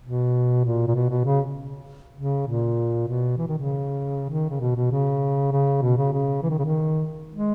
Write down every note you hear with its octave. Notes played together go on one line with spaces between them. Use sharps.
B2
A#2
A#2
B2
B2
C#3
C#3
A#2
B2
E3
D#3
C#3
D#3
C#3
B2
B2
C#3
C#3
B2
C#3
C#3
E3
D#3
C#3
D#3
G#3